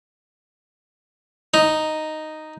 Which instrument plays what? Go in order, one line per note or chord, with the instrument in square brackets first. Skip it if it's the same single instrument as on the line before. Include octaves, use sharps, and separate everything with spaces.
[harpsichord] D#4